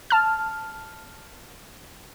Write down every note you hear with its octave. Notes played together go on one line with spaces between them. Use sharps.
A5 F6